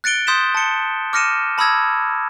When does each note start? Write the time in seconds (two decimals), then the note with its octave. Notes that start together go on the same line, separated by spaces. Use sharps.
0.04 F#6 A6 C#7 D7 G7
0.27 C6 D#6 G6 A6 B6 E7
0.55 A5 C6 C#7 G7
1.13 D6 F6 A#6 C#7 D#7 E7
1.58 A5 B5 D#6 E6 G#6 A#6